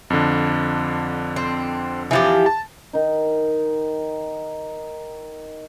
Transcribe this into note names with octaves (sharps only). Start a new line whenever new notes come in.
F2 D3
C4
E3 F3 G4
A5
D#3 D#4